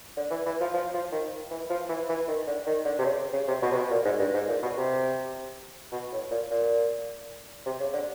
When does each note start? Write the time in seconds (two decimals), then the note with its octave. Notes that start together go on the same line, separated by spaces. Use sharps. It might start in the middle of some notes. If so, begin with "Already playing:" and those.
0.16 D3
0.31 E3
0.46 E3
0.60 F3
0.74 F3
0.94 F3
1.12 D#3
1.51 E3
1.70 F3
1.89 E3
2.09 E3
2.28 D#3
2.47 D3
2.67 D#3
2.85 D3
2.99 C3
3.04 C#3
3.33 C#3
3.48 C3
3.62 B2
3.72 C3
3.76 B2
3.90 A#2
4.05 G#2
4.19 G2
4.34 G#2
4.48 A#2
4.63 B2
4.77 C3
5.92 B2
6.12 A2
6.31 A#2
6.51 A#2
7.66 C3
7.80 C#3
7.93 D3